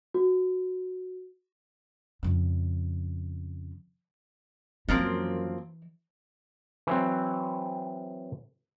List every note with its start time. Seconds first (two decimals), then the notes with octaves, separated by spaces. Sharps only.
0.14 F#4
2.23 F2 C#3
4.89 F#2 E3 F3 A#3 C4
6.87 E3 F#3 C4